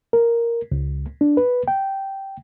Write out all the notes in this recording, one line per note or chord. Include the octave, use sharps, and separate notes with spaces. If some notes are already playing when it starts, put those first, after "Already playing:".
A#4
C#2
D4
B4
G5